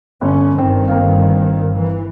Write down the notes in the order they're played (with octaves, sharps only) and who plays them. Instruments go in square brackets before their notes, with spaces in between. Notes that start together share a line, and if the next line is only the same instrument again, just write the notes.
[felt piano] G1 [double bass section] C#4
[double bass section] G1 G2 D#3 [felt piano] C4
[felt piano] A#3 C4 F5
[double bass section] E3